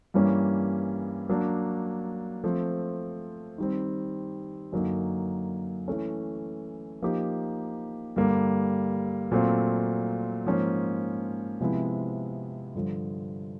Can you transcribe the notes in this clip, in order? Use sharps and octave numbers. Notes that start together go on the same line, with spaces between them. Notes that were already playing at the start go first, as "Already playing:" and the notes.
G2 E3 G3 A#3 C#4
F#3 A#3 D4
F3 A3 C4
D#3 G3 C4
F#2 D3 F#3 A#3 D#4
E3 A3 C#4
F3 A#3 D#4 G4
G2 D3 G3 A#3
A#2 F#3 A3 C4 F4
G#2 F3 A#3 C#4
C3 F3 G#3 B3 E4
G2 D3 F3